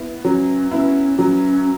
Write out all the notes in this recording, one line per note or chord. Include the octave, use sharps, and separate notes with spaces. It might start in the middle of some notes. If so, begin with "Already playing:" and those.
Already playing: B3 E4
F#3 C#4
B3 C#4 E4
F#3 C#4